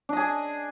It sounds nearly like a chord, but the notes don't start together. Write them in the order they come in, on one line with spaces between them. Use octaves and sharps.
D4 D#5 G#4